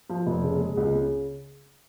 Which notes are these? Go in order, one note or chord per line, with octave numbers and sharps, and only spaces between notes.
F3
F1
C#3
G#3
C#2
C#3